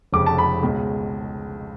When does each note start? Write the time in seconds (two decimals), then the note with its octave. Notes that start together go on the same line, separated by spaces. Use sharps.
0.12 F1 F2 C#3 D6
0.26 A5
0.38 B5
0.63 C#2 B2 G#3